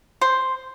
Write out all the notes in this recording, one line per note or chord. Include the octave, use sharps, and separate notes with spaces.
C5